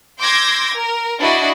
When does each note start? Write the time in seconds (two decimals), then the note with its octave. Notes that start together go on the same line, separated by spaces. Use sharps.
0.20 C6 D6 E6 G6 G#6 A#6
0.76 A#4
1.20 D4 E4 F#4 D5 D#5